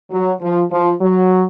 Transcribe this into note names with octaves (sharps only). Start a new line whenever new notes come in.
F#3
F3
F3
F#3